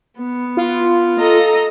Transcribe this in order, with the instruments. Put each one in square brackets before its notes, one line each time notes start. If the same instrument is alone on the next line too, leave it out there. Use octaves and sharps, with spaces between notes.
[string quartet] B3
[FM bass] F4
[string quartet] A4 D#5 A#5